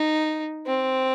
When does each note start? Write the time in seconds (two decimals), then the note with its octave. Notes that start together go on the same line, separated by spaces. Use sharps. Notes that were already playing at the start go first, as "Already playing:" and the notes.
Already playing: D#4
0.67 C4